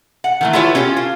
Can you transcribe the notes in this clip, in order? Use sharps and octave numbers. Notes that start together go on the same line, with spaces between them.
F#5
D#3 E3 A3
E4 F4 G4 A4 B4 C#5
C#4 F4 G4 A4
F4